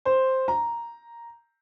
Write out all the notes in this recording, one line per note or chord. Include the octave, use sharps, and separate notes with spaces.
C5
A#5